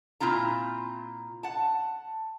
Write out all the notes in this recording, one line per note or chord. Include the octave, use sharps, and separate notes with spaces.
A#2 C4 E4 F4 A#5
F#5 A5